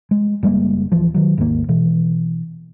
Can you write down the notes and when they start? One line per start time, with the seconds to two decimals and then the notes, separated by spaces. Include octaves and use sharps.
0.11 G#3
0.43 F#1 G3 G#3 A#3
0.92 D1 E3 F3
1.14 D#3 F#3
1.38 G#1 D#2 A#3
1.69 B2 E3